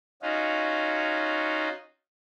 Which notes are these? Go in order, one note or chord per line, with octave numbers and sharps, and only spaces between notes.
C#4 D#4 F4 F#4